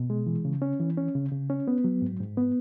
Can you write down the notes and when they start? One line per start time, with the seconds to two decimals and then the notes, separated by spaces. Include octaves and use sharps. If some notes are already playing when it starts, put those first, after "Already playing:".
Already playing: B2
0.10 G#3
0.27 E3
0.45 C#3
0.62 C#4
0.80 E3
0.98 C#4
1.15 C#3
1.32 C#3
1.50 C#4
1.68 B3
1.84 F#3
2.02 G#2
2.20 G#2
2.37 B3